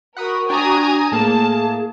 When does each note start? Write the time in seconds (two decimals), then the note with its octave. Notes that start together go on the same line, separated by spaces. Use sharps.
0.17 F#4 A#4 F#5 B5 D#6
0.49 D4 G5 G#5 A#5 D#6
1.12 A2 A#3 G#4 A5